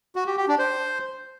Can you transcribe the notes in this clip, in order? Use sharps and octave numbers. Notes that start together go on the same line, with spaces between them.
F#4
G4
G4
D4
C5